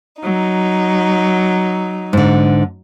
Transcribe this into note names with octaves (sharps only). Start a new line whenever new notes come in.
F#3 D#4
G#2 D3